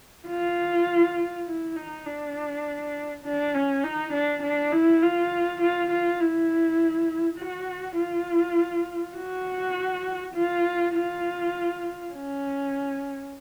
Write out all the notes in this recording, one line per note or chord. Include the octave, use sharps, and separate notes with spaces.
F4
E4
D#4
D4
D4
C#4
D#4
D4
D4
E4
F4
F4
F4
E4
F#4
F4
F#4
F4
F4
C#4